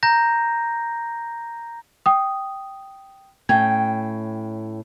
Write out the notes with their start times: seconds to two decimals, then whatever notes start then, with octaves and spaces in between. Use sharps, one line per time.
0.03 A#5 G6 A#6
2.06 G5 D#6
3.49 A2 C#4 G5 G#6